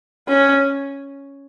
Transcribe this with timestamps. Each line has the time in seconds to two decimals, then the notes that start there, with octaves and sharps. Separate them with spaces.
0.28 C#4